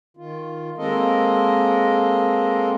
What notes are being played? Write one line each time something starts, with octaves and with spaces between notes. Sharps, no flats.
D#3 F4
G#3 A#3 C4 A4 A#4 D#5